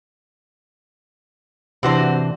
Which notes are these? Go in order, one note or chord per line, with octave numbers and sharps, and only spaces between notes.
C3 E3 C4 D4 F#4 C5